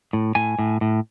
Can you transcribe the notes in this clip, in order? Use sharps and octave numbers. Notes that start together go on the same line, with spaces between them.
A2
A2 G#5
A2
A2